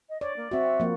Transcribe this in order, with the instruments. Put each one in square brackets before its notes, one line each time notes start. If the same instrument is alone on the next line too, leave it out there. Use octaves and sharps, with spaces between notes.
[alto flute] D#5
[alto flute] C#5 [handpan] D5
[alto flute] A#3
[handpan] C4 F#4 [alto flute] E5
[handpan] F3 A#3